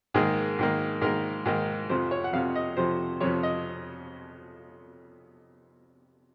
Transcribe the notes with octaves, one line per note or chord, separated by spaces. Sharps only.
G#2 D#3 A#3 G#4
G#2 D#3 A#3
G#2 D#3 A#3 A#4
G#2 D#3 A#3
F2 C3 F3 C5
C#5
F#5
F2 C3 F3 F5
D#5
F2 C3 F3 C5
F2 C3 F3 C#5
D#5